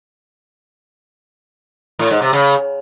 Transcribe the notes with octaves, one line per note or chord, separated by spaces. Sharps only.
A2
G#2
C3
C#3